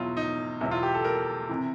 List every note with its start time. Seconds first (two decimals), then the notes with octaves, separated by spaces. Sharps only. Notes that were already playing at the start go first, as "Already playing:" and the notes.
Already playing: E2 B2 F#3 E4 F4
0.17 D#4
0.61 E2 B2 F#3 E4
0.71 F4
0.83 G4
0.94 A4
1.05 A#4
1.49 C3 E3